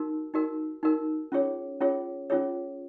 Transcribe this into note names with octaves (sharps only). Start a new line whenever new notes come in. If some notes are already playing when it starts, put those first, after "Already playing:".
Already playing: D#4 F#4 A#4
D#4 F#4 A#4
D#4 F#4 A#4
C#4 F4 G#4 C#5
C#4 F4 G#4 C#5
C#4 F4 G#4 C#5